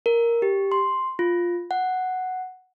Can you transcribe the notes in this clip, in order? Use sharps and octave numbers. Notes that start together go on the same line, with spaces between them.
A#4
G4
C6
F4
F#5